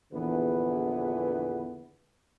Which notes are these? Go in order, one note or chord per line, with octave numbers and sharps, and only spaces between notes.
A#1 E2 D3 E3 B3 B4